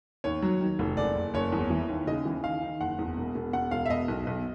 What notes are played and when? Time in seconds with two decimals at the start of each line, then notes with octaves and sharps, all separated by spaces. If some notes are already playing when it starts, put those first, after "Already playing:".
0.24 D#2 C#5
0.42 F#3
0.61 D#3
0.79 F1
0.97 F#1 D5
1.16 F#1
1.34 F#1 C#5
1.52 E2
1.70 E3
1.89 D#2
2.07 C#3 D#5
2.25 E3
2.44 D#3 F5
2.62 D#3
2.81 F#1 F#5
2.99 E2
3.17 E1
3.35 E1
3.53 E1 F#5
3.71 E1 F5
3.86 E5
3.90 B2 D#5
4.08 B1
4.27 B1